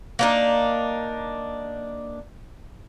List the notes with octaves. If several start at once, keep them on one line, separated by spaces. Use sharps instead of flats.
A#3 D4 D#4